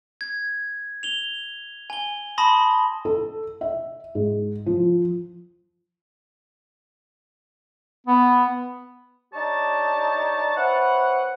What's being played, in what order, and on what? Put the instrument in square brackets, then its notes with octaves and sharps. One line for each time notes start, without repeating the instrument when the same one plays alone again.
[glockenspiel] G#6
F7 G7
G#5 G7
A5 B5 C6 D#6 A#6
[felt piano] A4
E5
G#2
F3
[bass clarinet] B3
[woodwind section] D4 D#4 G4 C#5 A5
C4 E4 B4 C#5 F#5